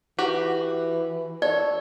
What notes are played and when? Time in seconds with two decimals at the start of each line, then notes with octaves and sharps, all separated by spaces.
0.19 E3 F#4 G4
1.42 A4 C#5 D5